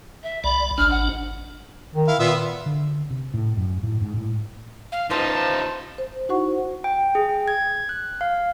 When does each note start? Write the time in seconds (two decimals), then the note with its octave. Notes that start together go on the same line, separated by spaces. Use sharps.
0.23 E5
0.44 C2 D5 B5
0.78 G#1 D4 F6
0.90 F#5
1.95 D#3
2.08 E4 F5
2.19 A#2 B3 F4 E5
2.66 D3
3.10 C3
3.34 A2
3.57 F#2
3.83 A2
4.02 G#2
4.17 A2
4.92 F5
5.10 C#4 D#4 F4 B4 C5 A5
5.98 C5
6.29 D#4 E4 F#4 C5 F#5 C#6
6.84 G5
7.15 G#4
7.29 G5
7.48 G#6
7.89 F#6
8.21 F5